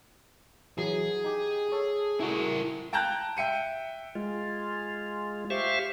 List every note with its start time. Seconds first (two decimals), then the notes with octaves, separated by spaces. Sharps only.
0.78 E3 F#3 G#4
1.24 D#4 G4
1.72 A4 C#5
2.20 A3 E4 F#4 G#4 A#4
2.93 G5 A5 A#5 F#6 G6
3.37 E5 G5 C#7 D#7
4.15 G#3 F4
5.50 G4 C5 E5 F5 C#6